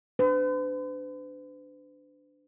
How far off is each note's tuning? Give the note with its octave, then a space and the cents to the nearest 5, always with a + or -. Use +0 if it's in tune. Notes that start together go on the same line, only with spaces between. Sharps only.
D4 +0 B4 +45